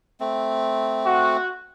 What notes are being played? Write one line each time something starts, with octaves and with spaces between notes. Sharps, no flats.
A3 C4
F#4